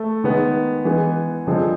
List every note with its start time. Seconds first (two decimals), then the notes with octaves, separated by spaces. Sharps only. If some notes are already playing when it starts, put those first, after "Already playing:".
Already playing: A3
0.24 D#3 G#3 B3
0.85 E3 G#3 B3
1.46 G2 D3 F3 G#3 C4